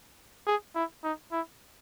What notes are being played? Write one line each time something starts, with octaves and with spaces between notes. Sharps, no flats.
G#4
E4
D#4
E4